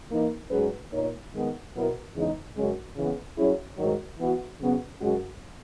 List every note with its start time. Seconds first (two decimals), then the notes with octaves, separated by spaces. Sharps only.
0.11 E3 A#3 D#4
0.51 G#2 F#3 C#4 G#4 B4
0.92 A#2 A#3 D#4 A#4 C#5
1.33 D#3 G#3 B3
1.74 B2 F#3 B3 E4 A#4
2.14 E2 C#3 E3 G#3 D#4
2.56 F#2 C#3 G#3 C#4 F#4
2.96 C#3 E3 B3
3.38 F#3 C#4 E4 G#4 C#5
3.78 G#2 D#3 F#3
4.19 E3 B3 F#4
4.60 C#3 F#3 B3
5.00 F#2 C#3 G#3 C#4 F#4